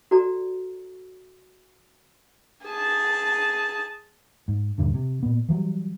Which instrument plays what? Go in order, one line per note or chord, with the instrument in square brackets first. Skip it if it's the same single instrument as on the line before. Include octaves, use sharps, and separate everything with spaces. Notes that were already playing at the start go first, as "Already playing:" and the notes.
[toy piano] F#4 A4 D5 A#5
[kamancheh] G#4 A5
[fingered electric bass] G#2
D#1 G#1 G2 D3
C3
A#2 B3
E3 F#3 G3